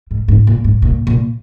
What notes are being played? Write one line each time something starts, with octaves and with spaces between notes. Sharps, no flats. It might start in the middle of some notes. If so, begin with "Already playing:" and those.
G#2
G#2
A#2
G#2
A#2
A#2